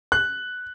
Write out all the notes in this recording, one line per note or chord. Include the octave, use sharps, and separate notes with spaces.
F#6